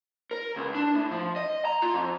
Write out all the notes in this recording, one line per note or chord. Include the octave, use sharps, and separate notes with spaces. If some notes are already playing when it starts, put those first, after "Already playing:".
A#4
C#2
D4
A2
F3
D#5
A#5
F4
F2